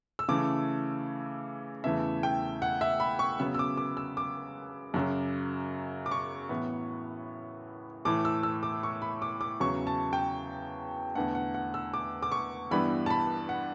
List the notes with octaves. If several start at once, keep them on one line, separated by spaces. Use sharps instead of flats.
E6
C#3 E3 A3 D6
E2 C#3 E3 A3 E5
G5
F#5
E5
B5
C#6
C#3 F#3 B3 E6
E6
D6
D6
E6
D6
F#2 C#3 F#3
D6
C#6
A2 E3 B3
A2 E3 A3 D6
E6
E6
D6
C#6
B5
D6
D6
E2 C#3 F#3 C#6
A5
G5
E2 D3 A3 F#5
F#5
F#5
E6
D6
D6
C#6
G2 E3 G3 B3 B5
A5
B5
F#5